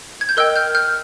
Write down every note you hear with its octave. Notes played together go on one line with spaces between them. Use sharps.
G#6
G6
A#4 D#5 G5 E6 F#6
F6 G6
F6 G6